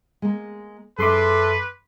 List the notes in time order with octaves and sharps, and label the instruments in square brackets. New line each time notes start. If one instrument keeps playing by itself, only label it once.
[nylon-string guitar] G#3 A#3
[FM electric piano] F#2 C6 D6 [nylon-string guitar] G#4 E5 [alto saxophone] A4 [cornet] B4